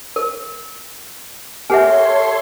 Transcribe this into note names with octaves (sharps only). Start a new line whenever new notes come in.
A#4
G4 A4 A#4 C#5 E5 F#5 G#5 C6